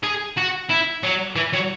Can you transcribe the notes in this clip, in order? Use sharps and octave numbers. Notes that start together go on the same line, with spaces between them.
G#4
F#4
E4
F#3
E3
F#3